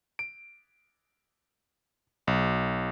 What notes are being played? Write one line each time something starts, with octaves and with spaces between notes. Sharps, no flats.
D7
B1